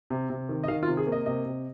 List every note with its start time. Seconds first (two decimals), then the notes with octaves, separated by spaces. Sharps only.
0.10 C3
0.30 C3
0.49 D#3
0.64 D#5
0.68 D#3 F5
0.83 F4
0.88 C3
0.97 G#4
1.07 A#3
1.12 D#5
1.26 C3 D#5
1.46 C3